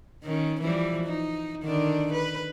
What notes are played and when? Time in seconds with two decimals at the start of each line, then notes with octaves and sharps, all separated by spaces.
0.23 D#3 C#4
0.61 E3 F3 G3
1.04 D#4
1.63 D3 D#3 D4
2.12 B4